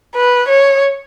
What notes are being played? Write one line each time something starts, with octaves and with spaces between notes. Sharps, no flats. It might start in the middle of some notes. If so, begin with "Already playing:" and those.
B4
C#5